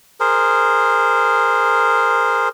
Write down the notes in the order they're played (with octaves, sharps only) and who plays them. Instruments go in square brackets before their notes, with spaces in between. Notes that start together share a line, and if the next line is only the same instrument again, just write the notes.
[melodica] G#4 A#4 C5